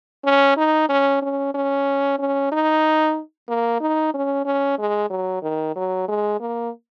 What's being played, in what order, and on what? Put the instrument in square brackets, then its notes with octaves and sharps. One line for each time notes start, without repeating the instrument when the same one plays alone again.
[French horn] C#4
D#4
C#4
C#4
C#4
C#4
D#4
A#3
D#4
C#4
C#4
G#3
F#3
D#3
F#3
G#3
A#3